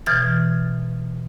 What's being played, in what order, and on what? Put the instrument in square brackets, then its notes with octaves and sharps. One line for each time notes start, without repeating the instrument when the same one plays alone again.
[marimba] B2 E3 F6 G#6 A6